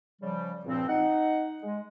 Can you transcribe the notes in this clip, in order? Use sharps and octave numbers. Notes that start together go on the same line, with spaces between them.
C#3 F3 G3
C#2 G2 A#2 F3 C4
D#4 F#5
G#3